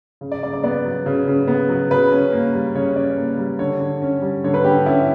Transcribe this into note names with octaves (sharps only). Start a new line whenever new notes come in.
C#3
D5
C#3 D5
D5
B3 D5
F#3
C#3
C#3
B3
F#3
C#3 B4
C#4
A#3
G3
C#3 C#5
C#4 D5
A#3
G3
D3 C#5
D3
C#4
G3
D3 C#5
B4
D3 G4
C#4 E4